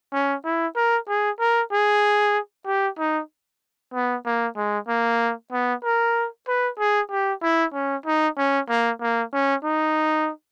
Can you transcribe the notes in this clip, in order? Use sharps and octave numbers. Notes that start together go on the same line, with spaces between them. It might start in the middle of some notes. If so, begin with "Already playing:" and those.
C#4
E4
A#4
G#4
A#4
G#4
G4
D#4
B3
A#3
G#3
A#3
B3
A#4
B4
G#4
G4
E4
C#4
D#4
C#4
A#3
A#3
C#4
D#4